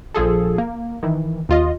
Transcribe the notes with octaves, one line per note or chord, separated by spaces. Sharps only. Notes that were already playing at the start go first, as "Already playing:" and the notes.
A#1 F3 G#4 A4
A#3
D#3 E3
D#2 F4 D#5